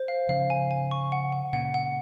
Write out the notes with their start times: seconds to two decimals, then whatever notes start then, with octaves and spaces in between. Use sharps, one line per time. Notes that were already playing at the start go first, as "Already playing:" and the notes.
Already playing: C5
0.08 F5
0.29 C#3 F3 F5
0.50 G#5
0.71 G#5
0.91 C#6
1.12 F#5
1.32 F#5
1.53 A#2 C#3 F#5
1.74 F#5